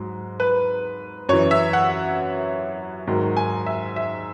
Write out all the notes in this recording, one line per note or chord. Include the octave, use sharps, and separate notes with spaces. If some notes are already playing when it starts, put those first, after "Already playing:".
Already playing: G#2 F#3
B4
F#2 E3 C#5
E5
F#5
G#2 D#3 F#3
G#5
E5
E5